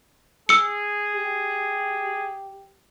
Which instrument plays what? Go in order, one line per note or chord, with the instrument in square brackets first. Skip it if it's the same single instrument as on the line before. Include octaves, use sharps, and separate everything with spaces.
[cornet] G#4 [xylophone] E6 C#7
[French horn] G4